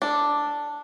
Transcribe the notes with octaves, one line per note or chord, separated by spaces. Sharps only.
D4 A4